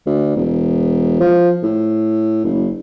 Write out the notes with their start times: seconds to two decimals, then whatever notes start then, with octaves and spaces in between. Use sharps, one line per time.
0.06 D2
0.36 E1
1.20 F3
1.63 A2
2.44 F#1